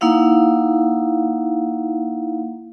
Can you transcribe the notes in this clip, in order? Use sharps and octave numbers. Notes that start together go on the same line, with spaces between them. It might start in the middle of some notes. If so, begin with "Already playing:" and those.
A#3 D#4 E4 F5 F#5